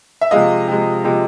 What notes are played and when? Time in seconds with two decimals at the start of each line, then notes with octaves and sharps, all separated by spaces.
0.21 E5
0.31 C3 F3 G#3 D#5 F5
0.68 C3 F3 G#3
1.04 C3 F3 G#3